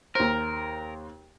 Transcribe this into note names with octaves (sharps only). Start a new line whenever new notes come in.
D#2 A#4 C5